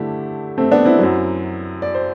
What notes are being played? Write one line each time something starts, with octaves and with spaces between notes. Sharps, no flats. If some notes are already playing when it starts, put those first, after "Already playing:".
Already playing: G2 D3 A3 E4 G4
A3 C4
B3 D4
C4 E4
F#2 F#3
D5
C5